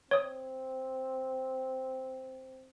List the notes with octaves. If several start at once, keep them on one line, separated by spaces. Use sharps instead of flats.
C4 C#5 D#6